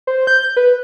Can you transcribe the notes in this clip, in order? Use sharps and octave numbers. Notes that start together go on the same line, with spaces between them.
C5
G6
B4